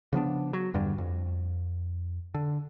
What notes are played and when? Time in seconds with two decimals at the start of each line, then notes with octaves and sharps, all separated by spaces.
0.13 C#3 F3 B3 D4
0.53 F#3
0.74 E2 G2 D3 G3
0.98 F2
2.34 D3